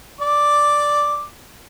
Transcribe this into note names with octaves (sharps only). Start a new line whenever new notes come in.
D5 D6